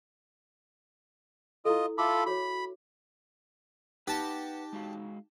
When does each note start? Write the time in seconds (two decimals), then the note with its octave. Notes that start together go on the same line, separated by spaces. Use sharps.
1.65 E4 F4 A4 D#5
1.98 F4 A4 E5 B5 D6
2.26 F#4 C#5 B5
4.07 D#4 G4 B4 F#5 A5 F#6 A#6
4.73 G#3 F#4 F5